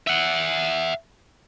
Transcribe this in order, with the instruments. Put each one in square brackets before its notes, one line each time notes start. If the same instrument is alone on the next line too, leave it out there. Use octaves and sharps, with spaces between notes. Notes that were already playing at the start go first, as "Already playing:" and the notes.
[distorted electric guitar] E5 F#5